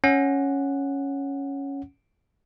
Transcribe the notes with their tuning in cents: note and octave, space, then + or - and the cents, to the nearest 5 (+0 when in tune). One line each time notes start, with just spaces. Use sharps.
C#4 +0 F#5 +0